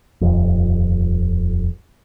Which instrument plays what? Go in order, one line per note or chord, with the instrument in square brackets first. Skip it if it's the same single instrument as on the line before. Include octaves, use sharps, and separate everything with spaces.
[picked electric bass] D#1 F2